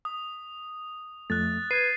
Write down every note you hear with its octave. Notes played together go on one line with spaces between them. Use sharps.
D#6
F2 A3 F#6 A6
B4 G#6 C7 D#7